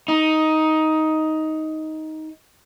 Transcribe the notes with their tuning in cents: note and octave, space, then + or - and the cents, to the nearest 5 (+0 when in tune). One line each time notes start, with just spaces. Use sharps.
D#4 +10